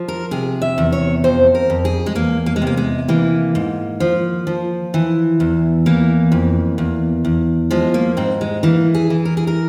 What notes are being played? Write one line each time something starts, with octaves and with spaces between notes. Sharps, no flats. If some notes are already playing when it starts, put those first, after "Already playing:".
Already playing: F3
A#4
C3 G#4
E5
E2
C#5
F2 C5
A#4
F2
G#4
G#3
E2 A#3
A#3
G#3
C3
A#3
G#3
E3 A#3
G#2
F3
F3
E3
E2
E3 A#3
F2
E2
E2
F3 G#3
A#3
G#2 C4
G#3
E3 A#3
G#4
E3
A#4
G#4
A#4